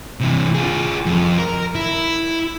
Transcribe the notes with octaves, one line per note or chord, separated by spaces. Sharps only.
C3 E3
F4 G#4
F2
A#4
E4